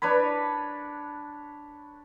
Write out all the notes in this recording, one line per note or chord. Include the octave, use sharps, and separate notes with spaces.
D4 B4 C#5 B5